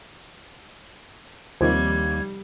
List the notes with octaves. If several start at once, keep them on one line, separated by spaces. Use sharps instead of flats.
D#2 C3 D#3 F3 G3 G#6